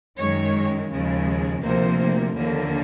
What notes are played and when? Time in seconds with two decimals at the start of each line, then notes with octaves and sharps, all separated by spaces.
0.17 F#2 D#3 G#3 C#5
0.90 D#2 C#3 F3 G#3
1.62 D2 C3 F3 A#3 C5
2.34 D#2 D3 F3 A#3